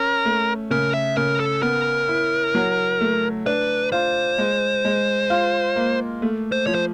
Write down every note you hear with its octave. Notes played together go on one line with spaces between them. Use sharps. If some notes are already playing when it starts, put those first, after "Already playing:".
Already playing: C#4 A#4
A3
C#3 A#4
E5
C#3 A#4
A4
B3 A#4
E4
F#3
A3
D4 B4
F4 C5
G#3
G#3
F4
A#3
A3
C5
F3 C#5
C5